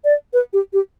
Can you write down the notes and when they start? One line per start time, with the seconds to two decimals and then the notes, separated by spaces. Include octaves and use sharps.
0.04 D5
0.33 B4
0.53 G4
0.73 G4